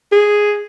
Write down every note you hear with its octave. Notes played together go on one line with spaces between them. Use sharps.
G#4